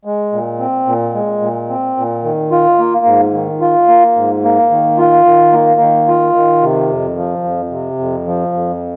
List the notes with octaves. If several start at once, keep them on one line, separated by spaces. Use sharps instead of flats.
G#3
A#2
C4
A#2
G#3
A#2
C4
A#2
D#3
F4
A#3
G#2
D#3
F4
A#3
G#2
A#3
D#3
F4
D#3
A#3
D#3
F4
D#3
C3
F2
F3
F2
C3
F2
F3
F2